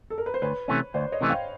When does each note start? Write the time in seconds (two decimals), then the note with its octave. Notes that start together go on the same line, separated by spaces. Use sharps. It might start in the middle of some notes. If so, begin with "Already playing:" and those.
0.10 A4
0.18 A#4
0.26 B4
0.34 C5
0.42 D2 B4 C#5
0.68 C3 E3 A3 C#4
0.94 D2 C5 D5
1.12 C#5 D#5
1.21 C3 E3 A3 C#4
1.29 F5 G5